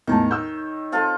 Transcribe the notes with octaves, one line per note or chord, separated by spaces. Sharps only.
E2 A2 D#3 C#5 A5
E6 G6
C4 F4 A4